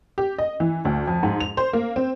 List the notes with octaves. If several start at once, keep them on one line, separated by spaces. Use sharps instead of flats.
G4
D#5
E3
D2
F2
G#2
F7
C5
A#3
C4